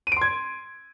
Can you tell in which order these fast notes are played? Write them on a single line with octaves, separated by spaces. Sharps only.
D#7 D7 C6 G#6